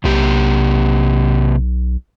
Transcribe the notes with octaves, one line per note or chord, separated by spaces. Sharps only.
B1 C3 A#3 G4